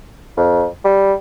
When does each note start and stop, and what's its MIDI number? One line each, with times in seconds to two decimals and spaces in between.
0.37 0.66 41
0.85 1.14 55